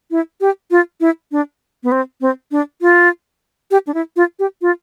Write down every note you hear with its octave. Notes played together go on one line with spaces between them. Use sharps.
E4
G4
F4
E4
D4
B3
C4
C4
D4
F4
G4
D4
E4
F4
G4
F4